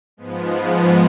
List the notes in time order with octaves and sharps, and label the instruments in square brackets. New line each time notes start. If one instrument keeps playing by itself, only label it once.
[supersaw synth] G#2 F3 G#3 B3